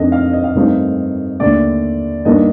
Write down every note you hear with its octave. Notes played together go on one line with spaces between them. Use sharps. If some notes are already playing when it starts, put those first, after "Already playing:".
Already playing: F2 D#3 A3 D4 D#5
F5
D#5
F5
G2 D#3 A3 C4 D#4
D#2 D3 A3 D5
G2 D#3 A#3 D4 D#5